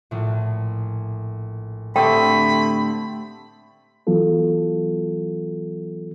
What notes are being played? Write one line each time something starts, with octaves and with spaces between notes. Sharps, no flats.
A#1 A2
D3 A3 C4 G4 A4 G5 B5 D#6
E3 F#3 B3 F4 A4